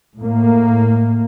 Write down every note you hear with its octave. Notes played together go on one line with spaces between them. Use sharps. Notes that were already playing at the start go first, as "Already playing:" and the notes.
A2 A#3